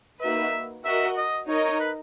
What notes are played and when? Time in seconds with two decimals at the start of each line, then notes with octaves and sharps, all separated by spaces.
0.21 A#3 D#4 F#4 B4 E5
0.84 F#4 A#4 D#5 E5 F#5
1.17 D#5
1.48 D#4 A#4 C#5 D#5
1.64 C#5
1.79 B4